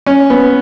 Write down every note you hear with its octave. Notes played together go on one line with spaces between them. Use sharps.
C#4
B3